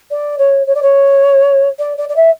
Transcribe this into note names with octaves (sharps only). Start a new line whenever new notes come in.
D5
C#5
C#5
D5
C#5
D5
D5
D5
E5